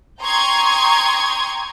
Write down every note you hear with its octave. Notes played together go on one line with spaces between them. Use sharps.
G5 A#5 C6 C#6 D#6 G#6